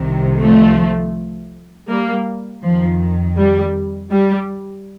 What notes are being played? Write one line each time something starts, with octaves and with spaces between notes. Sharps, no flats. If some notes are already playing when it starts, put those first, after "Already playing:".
Already playing: C2 C3 D#3
F3 A3
G3 A#3
F2 D#3 F3
G3
G3